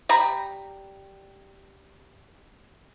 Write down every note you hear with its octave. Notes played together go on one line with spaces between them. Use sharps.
G3 A#5 B5